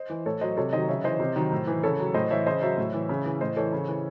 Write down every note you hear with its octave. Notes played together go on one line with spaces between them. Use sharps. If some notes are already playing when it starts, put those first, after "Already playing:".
Already playing: C5 D#5
E3
A2 A4 C#5
F#3 C5 D#5
C3 A4 C#5
D#3 F#3 C5 D#5
C#3 C#5 E5
E3 C5 D#5
C3
D#3 F#3
A2
E3
C#3 A4 C#5
F#3
A2 C5 D#5
E3 C#5 E5
C#3 C5 D#5
F#3 C#5 E5
A2
E3
C#3
E3
A2 C5 D#5
E3 A4 C#5
C#3
E3